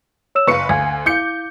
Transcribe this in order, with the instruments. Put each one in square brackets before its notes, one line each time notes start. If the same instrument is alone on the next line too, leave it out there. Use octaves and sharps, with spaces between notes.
[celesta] C#5 E6 E7
[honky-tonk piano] F#1 B4 C#7 [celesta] F5 C#6
[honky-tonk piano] D2 [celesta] F5 G#5 G#6
[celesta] E4 F5 [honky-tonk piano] D6 G6 C#7